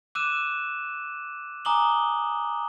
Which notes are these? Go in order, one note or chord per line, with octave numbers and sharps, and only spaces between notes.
D6 E6 F#6 D#7 E7
G#5 A#5 D6 D#6 F#7 G7